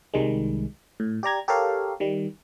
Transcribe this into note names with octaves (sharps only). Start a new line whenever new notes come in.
C2 D#3 G3 G#3
A2
G4 D5 A#5 G#6
G4 A4 A#4 C#5 F5
D#3 G3